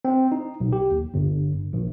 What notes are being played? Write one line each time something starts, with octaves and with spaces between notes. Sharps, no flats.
C4
D#4
B1
G4
D#2
G1
A#1